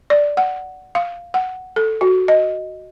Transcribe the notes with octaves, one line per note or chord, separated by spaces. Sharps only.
D5
F#5
F5
F#5
A4
F#4
D#5